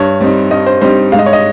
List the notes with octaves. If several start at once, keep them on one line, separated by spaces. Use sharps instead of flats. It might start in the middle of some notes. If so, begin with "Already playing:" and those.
Already playing: G2 C#5
G3 C4 D#4
G2 D#5
C5
G3 C4 D#4 C5
G#2 F5
D#5
C#5
D#5